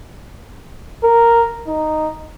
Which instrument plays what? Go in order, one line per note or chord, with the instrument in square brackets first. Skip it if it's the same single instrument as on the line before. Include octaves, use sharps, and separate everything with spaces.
[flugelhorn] A#4
D#4